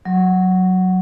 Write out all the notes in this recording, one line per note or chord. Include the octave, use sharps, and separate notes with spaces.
F#3